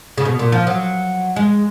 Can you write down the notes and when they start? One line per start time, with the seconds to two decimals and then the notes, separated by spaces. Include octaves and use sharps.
0.18 C#3
0.25 B2
0.39 A#2
0.52 F3
0.67 F#3
1.36 G#3